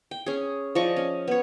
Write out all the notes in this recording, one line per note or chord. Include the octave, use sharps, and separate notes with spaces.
G5
C#4 G#4
F3 D5 D#5 C#6
C#4
B3 C#5